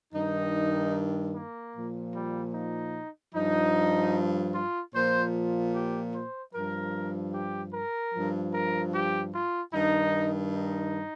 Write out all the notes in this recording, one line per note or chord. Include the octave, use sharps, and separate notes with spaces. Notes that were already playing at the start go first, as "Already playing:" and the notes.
G2 D#3 D#4
A#3
A#2 F3
G3
D#4
G2 F3 D#4
F4
A#2 F3 C5
G4
C5
G2 F3 A#4
G4
A#4
G2 F3
A#4
G4
F4
G2 D#3 D#4
D#4